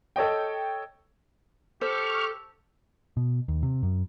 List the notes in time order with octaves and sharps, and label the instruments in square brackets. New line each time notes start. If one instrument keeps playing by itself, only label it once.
[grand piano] A4 C#5 D#5 G5
[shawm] G4 [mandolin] A4 [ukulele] C5 [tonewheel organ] C#6 F6
[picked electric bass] B2
D#2
C3
F#2